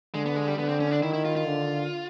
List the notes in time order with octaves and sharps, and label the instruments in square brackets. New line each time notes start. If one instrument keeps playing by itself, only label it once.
[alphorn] D3 [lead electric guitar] G#3
[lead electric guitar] B3
G#3
G3
[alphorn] D3 [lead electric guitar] B3
[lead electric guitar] C4
C#4
D4
[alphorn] D#3 [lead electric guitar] E4
[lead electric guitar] E4
F4
F4
[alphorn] D3